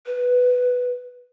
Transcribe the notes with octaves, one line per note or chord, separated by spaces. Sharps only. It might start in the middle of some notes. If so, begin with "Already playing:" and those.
B4